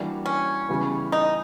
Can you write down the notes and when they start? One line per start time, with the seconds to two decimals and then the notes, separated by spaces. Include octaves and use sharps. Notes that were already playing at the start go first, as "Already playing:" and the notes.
Already playing: E3 G3 A#3 D4 F#4
0.26 C#4
0.69 C#3 E3 G3 B3
1.12 D#4